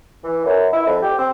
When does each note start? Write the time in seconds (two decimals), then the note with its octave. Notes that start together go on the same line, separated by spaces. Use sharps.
0.23 E3
0.45 F#2
0.73 E4
0.86 F2
1.02 G4
1.18 C4